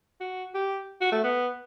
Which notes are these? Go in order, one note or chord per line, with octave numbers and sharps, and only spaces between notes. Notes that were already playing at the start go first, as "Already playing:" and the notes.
F#4
G4
F#4
A3
B3